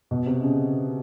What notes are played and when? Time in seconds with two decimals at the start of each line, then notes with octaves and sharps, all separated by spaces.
0.11 B2
0.26 C3
0.42 C#3